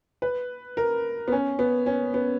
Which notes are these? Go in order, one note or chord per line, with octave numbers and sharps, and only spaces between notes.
B4
A#4
B3
C#4
B3
C#4
B3